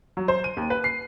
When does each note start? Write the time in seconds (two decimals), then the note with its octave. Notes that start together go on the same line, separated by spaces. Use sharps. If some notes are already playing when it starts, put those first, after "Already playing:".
0.17 F#3
0.28 C5
0.44 D#7
0.57 D#2
0.70 B4
0.84 C7